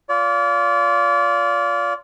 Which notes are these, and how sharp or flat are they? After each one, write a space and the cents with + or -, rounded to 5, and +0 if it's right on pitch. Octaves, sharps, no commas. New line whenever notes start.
F4 +0 D5 -35